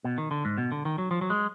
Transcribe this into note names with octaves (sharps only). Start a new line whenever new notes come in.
B2
D#3
D3
G#2
B2
D3
D#3
F#3
F3
F#3
G#3